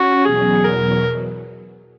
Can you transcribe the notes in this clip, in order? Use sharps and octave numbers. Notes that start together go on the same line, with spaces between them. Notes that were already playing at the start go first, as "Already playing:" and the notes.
Already playing: C#4 F#4
E2 B2 F#3 G#4
A#4